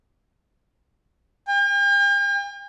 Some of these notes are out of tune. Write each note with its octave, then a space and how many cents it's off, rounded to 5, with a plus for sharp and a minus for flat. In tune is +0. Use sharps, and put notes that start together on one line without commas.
G5 +45